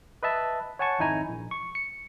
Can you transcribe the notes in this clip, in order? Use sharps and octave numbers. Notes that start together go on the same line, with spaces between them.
B4 D#5 E5 A5
C#5 F#5 G#5 A5 C#6
G#1 F2 D#4 E4 G#5 A#5
A#1
C#6
C#7